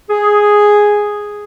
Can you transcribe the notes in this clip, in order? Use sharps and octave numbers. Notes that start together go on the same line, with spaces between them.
G#4